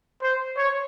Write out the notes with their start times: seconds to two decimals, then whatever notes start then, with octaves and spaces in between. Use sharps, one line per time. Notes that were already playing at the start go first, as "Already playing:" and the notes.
0.22 C5
0.57 C#5